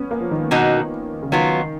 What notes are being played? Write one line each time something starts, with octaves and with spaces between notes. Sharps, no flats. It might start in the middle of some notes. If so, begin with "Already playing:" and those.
Already playing: B3 C#4
A#3
F3
D#3
B2 D#3 A#3 D#4 F#4
C#3
D#3 F#3 B3 F4